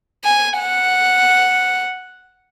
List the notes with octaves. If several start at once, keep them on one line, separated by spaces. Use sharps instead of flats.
G#5
F#5